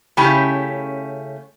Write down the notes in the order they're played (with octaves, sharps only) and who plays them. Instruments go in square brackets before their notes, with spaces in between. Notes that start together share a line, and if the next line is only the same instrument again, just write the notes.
[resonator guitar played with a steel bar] C#3 A3 C#4 E4 G4